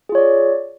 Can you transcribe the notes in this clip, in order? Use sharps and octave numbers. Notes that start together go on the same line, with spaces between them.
F4 G#4 C#5 D5